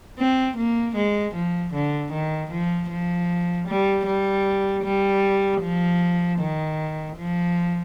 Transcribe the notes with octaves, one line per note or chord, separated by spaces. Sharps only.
C4
A#3
G#3
F3
D3
D#3
F3
F3
G3
G3
G3
F3
D#3
F3